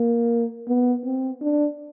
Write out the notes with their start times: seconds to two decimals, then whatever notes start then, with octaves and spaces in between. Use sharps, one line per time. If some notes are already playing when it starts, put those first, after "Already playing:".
Already playing: A#3
0.68 B3
1.05 C4
1.41 D4